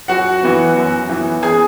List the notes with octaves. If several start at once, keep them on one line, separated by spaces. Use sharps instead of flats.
F#2 F#4 F#5
E3 B3
F#2
E3 B3
G#4 G#5